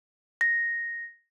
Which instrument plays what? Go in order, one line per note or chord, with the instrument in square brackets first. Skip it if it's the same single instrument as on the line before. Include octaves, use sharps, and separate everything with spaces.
[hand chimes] A#6